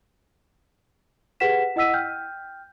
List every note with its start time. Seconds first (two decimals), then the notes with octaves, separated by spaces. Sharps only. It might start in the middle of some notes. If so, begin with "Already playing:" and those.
1.40 G4 G#4 B4 F#5 B6 E7
1.76 E4 D#5 F#5 E6 B6 D#7
1.94 G5 F6 G6